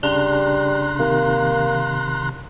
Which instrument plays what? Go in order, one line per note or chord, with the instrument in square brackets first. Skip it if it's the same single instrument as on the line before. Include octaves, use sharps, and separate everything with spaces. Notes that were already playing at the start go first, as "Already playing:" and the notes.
[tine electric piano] C#3 D4 [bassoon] G3 [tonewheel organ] A#5 C6 F#6
[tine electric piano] C3 D#3 [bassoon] A#3